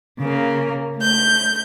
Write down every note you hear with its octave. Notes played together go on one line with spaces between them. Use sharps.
C#3 A#3
A3 G6